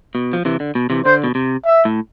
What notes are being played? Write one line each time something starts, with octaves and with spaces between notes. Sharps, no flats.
B2
F3
C3 E3
D3
B2
C3 E3
D3 C5
B2
C3
E5
A2